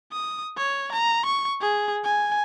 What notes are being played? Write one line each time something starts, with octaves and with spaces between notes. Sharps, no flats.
D#6
C#5
A#5
C#6
G#4
G#5